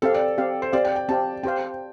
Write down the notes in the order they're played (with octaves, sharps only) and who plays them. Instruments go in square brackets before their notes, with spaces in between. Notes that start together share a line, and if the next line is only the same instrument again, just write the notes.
[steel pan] C4 G4 F5 [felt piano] A4
[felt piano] D5
[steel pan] C4 G4 F5
[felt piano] C5
[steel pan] C4 G4 F5 [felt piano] D5
[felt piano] G5
G5
[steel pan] C4 G4 F5 [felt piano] A5
[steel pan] C4 G4 C5 F5 [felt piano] G5